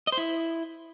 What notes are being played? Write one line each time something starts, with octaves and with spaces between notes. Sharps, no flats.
D#5
C5
E4